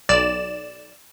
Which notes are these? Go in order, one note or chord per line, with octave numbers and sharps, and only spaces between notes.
B1 D5 E7